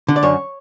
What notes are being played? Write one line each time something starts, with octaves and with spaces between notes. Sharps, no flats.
D3
D5
F#2 C#5